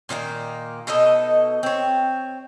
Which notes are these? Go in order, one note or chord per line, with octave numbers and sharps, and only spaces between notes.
A#2 D#3 A3 A#3
B2 D#4 A4 D#5
C4 C#5